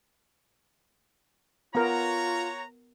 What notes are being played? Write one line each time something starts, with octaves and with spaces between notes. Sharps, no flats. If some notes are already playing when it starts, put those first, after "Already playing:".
B3 F4 F#4 A#4 C#5 A#5